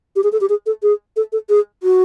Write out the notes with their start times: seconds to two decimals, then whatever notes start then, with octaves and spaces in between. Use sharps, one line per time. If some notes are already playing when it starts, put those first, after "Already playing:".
0.16 G4
0.23 G#4
0.32 A4
0.41 G4
0.49 G#4
0.66 A4
0.82 G#4
1.16 A4
1.32 A4
1.49 G#4
1.83 F#4